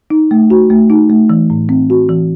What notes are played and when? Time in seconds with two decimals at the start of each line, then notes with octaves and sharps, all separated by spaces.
0.10 D#4
0.31 A3
0.50 F#4
0.70 A3
0.90 D#4
1.09 A3
1.30 E3
1.50 A2
1.69 C4
1.90 F#4
2.09 E3